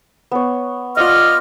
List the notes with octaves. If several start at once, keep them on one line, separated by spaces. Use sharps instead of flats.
B3 C#5
F4 D5 D#5 F#5 F6